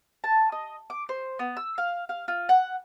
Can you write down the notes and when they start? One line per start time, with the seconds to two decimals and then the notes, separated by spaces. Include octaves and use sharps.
0.24 A5
0.52 D#5
0.90 D6
1.09 C5
1.39 B3
1.57 E6
1.78 F5
2.09 F5
2.28 F4
2.49 F#5